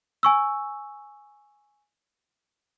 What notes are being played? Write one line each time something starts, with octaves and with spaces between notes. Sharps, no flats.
G#5 C#6 E6